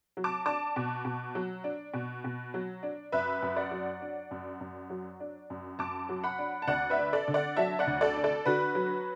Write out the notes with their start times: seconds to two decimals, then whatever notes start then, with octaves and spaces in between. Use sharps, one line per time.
0.17 F#3
0.24 A5 D6
0.45 D4 A5 D6
0.76 B2
1.05 B2
1.35 F#3
1.64 D4
1.94 B2
2.24 B2
2.54 F#3
2.83 D4
3.12 F#2 B4 E5
3.43 F#2
3.56 D5 F#5
3.71 F#3
4.02 D4
4.31 F#2
4.61 F#2
4.90 F#3
5.20 D4
5.50 F#2
5.79 F#2 A5 D6
6.09 F#3
6.23 F#5 B5
6.39 D4
6.62 A5
6.68 D2 D5 F#5
6.90 B4 E5
6.98 D4
7.13 A4 D5
7.28 D3
7.34 D5 F#5
7.56 F#3 E5 A5
7.79 D5 F#5
7.87 D2
8.01 A4 D5
8.16 D4
8.24 A4 D5
8.46 D3 F#4 B4
8.75 F#3